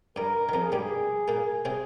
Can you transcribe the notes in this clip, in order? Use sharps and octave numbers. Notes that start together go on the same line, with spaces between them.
G2 G3 A#4
A#4
D#3
F2 F3 A#4
G#4
G2 G3 G4
G#4
A#2 A#3
C3 C4 G#4